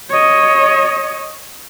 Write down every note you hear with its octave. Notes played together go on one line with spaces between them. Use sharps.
C#5 D#5